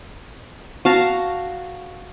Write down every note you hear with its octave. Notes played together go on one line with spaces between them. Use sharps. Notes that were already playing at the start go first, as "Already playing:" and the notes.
F#4 F5 A5 A#5